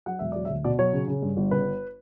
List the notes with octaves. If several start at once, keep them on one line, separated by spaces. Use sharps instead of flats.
F#3 F#5
E1 E5
F#3 D5
E5
D2
B2 D5
F#3 C#5
C#3
C#3
G2
G1
C#3 B4